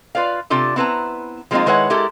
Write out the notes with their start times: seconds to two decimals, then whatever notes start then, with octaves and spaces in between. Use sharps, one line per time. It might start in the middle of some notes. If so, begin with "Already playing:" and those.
0.15 F4 B4 D5 F5
0.50 C3 D4 F4 G4 A4
0.76 B3 C4 E4 B4 A5 A#5
1.51 F3 G#3 A#3 C4 D#4 F4
1.66 D#3 G#3 E4 B4 C#5 F#5
1.90 G#3 E4 G4 A4 A#4